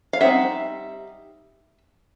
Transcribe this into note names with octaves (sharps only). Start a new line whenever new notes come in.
F5
G3 C4 D#4 E5 F#5